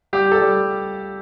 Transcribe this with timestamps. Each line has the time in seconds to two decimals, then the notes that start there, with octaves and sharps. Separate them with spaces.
0.13 G3 G4
0.32 A4
0.42 G3